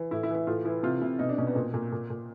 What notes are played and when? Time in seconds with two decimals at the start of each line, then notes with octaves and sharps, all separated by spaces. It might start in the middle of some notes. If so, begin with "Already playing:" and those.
Already playing: E3
0.11 A2 E4
0.23 E4
0.30 E3
0.35 E4
0.47 A2 F4
0.65 E3 E4
0.83 C3 F4
1.01 C3 E4
1.19 B2 D#4
1.29 D4
1.38 B2 C#4
1.47 B3
1.55 A#2 C4
1.74 A#2
1.92 A#2
2.10 A#2